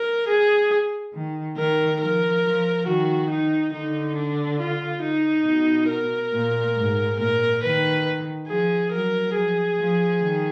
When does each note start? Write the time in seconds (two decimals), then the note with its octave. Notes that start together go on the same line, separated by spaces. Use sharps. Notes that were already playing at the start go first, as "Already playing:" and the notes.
Already playing: A#4
0.28 G#4
1.14 D#3
1.57 D#3 A#4
2.00 F3 A#4
2.44 F3
2.86 D#3 F#4
3.30 D#4
3.73 D3 D#4
4.16 D4
4.60 F4
5.02 D#4
5.47 B2
5.89 A#4
6.33 A#2
6.76 G#2
7.18 A#2 A#4
7.63 D#3 B4
8.48 F3 G#4
8.92 F#3 A#4
9.35 F3 G#4
9.79 F3
10.21 D#3